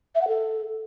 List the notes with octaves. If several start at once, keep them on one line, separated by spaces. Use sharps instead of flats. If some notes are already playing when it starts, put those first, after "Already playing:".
E5
F#5
A4